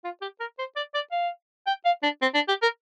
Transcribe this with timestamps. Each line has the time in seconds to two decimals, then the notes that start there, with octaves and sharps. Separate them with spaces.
0.04 F4
0.22 G4
0.40 A#4
0.59 C5
0.76 D5
0.94 D5
1.12 F5
1.67 G5
1.85 F5
2.03 D4
2.22 C4
2.34 D4
2.48 G4
2.62 A#4